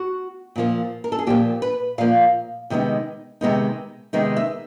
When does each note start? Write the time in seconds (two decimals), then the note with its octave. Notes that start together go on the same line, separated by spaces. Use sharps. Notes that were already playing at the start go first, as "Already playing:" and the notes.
Already playing: F#4
0.56 A#2 F3 A#3
1.04 A#4
1.12 A4
1.19 G#4
1.27 A#2 F3 A#3 G4
1.62 B4
1.98 A#2 F3 A#3 F5
2.70 C3 D#3 G#3 B3 D#4
3.41 C3 D#3 G#3 B3 D#4
4.13 C3 D#3 G#3 B3 D#4
4.37 E5